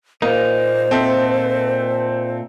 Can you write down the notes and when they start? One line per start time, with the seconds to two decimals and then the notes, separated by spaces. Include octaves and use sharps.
0.22 A#2 A#3 D#4 C5
0.91 C4 A4 E5